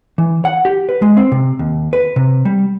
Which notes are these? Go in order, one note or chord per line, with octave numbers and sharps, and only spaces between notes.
E3
F#5
G4
B4
G#3
C4
C3
D#2
B4
C3
G3